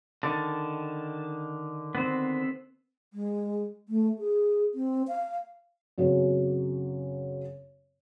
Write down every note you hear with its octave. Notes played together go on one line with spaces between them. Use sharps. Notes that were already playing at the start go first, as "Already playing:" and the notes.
D3 D#3 A5
B3 C4
G#3
A3
G#4
C4
F5
F#2 C#3 F#3 B3 C4